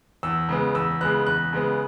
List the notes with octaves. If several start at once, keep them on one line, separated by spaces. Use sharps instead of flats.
E2 E6
C#3 G#3 B3
E2 E6
C#3 G#3 B3 F#6
E2 F#6
C#3 G#3 B3